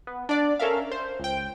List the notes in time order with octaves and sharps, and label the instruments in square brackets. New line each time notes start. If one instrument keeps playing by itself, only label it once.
[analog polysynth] B3
D4 D5
C#4 A4 A#4 E5 F5
C5
C#2 G5